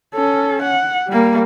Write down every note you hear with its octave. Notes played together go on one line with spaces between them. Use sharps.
C#4 A4
F#5
G3 A#3